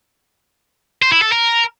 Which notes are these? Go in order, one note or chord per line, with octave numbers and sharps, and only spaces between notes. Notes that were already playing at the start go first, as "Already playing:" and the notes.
C5
E4
A4
A#4